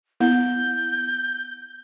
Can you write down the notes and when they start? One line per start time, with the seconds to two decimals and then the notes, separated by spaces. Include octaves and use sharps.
0.21 B3 E4 G6